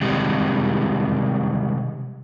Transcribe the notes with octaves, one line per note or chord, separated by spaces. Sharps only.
C3 D#3 G3 G#3